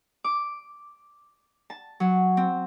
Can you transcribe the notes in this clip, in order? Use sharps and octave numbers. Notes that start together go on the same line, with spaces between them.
D6
A5
F#3
C4